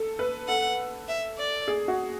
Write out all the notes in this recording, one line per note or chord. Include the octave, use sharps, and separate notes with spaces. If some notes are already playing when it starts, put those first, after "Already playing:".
Already playing: A4
B4
A4 F#5
E5
D5
G#4
F#4